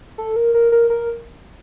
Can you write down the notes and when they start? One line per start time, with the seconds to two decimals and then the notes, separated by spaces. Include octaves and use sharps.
0.18 A4
0.36 A#4
0.54 A#4
0.72 A#4
0.90 A#4